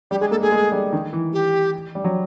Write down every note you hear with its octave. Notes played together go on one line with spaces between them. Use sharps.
G3 G4
G#3 G#4
A#3 A4
A3 G#4
G#3
G3
D#3
E3
G4
G3
F#3